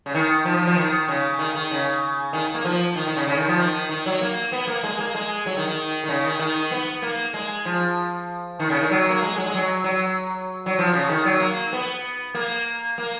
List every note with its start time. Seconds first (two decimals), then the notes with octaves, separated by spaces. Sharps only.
0.06 C#3
0.15 D#3
0.45 F3
0.57 F3
0.67 F3
0.77 D#3
1.08 C#3
1.39 D#3
1.55 D#3
1.71 C#3
2.33 D#3
2.54 A#3
2.65 F3
2.96 D#3
3.07 D#3
3.17 C#3
3.27 C#3
3.37 D#3
3.48 F3
3.59 D#3
3.89 D#3
4.06 F#3
4.21 A#3
4.52 B3
4.67 A#3
4.83 G#3
4.99 A#3
5.15 G#3
5.46 F#3
5.57 D#3
5.68 D#3
6.04 D#3
6.08 C#3
6.25 D#3
6.40 D#3
6.71 B3
7.02 A#3
7.34 G#3
7.65 F3
8.60 D#3
8.70 C#3
8.80 D#3
8.91 F#3
9.10 A#3
9.22 G#3
9.37 F#3
9.46 G#3
9.54 F#3
9.84 F#3
10.66 F#3
10.79 F3
10.93 C#3
11.10 D#3
11.25 F#3
11.40 A#3
11.73 B3
12.35 A#3
12.98 A#3